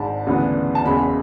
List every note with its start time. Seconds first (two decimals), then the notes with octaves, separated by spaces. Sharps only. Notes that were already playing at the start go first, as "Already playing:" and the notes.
Already playing: G#1 G#2 G#3 D4 A5 B5
0.27 D2 C#3 E3 B3 D4
0.75 A5
0.85 F#1 E2 C#3 G#3 B5